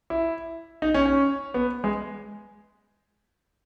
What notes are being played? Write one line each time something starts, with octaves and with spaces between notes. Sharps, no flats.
E4
D#4
C#4
C#4
B3
G#3